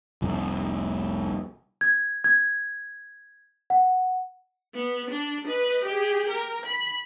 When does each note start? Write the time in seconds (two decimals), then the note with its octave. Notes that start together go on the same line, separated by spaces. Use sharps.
0.22 F1 C2
1.81 G#6
2.24 G#6
3.70 F#5
4.75 B3
5.11 D4
5.45 B4 D#5
5.84 G4 G#4
6.29 A#4
6.66 B5